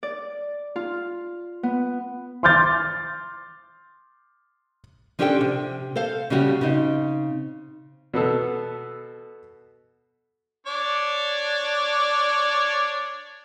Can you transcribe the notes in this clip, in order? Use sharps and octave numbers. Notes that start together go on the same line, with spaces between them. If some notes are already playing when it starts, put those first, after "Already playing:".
D5
F4
B3
C6 D6 F6 G6 A6
F3 C#4 D4 G4 A4 G5
C3
A4 C5 F5
C#3 F3 G3 C#4 F#4 G4
C#3 C4 D#4
B2 B3 A4
D4 C#5 D5